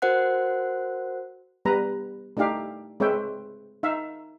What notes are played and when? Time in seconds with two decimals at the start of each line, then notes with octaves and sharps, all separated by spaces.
0.02 F#4 A#4 C5 F#5 F#6
1.65 G3 B3 B4 A#5
2.37 A3 D4 D#4 G4 F5
3.00 G#3 C4 B4 C#5 E5 G5
3.83 D#4 E5 F5